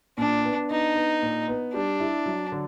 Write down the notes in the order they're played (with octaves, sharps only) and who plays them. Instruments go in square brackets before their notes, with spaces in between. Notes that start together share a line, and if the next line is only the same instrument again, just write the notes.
[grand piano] A#2 [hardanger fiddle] D4
[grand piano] B3
[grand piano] B3 [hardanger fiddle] D#4
[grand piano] B3
A#2
B3
[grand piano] G3 [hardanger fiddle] D4
[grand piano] E4
F#3
D3